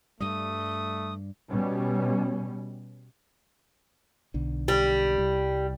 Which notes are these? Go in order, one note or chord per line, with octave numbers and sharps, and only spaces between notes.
G2 G3 A3 D#6
B2 G3 C#4
B1 D3
G3
C2